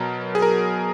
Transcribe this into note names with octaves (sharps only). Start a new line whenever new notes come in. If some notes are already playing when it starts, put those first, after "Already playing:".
Already playing: B2 F#3 A#4
G#4
A#4